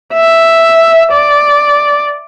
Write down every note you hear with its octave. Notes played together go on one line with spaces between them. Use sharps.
E5
D5